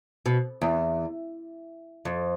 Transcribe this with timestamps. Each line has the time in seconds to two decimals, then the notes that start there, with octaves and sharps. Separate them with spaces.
0.26 B2
0.62 E2
2.05 F2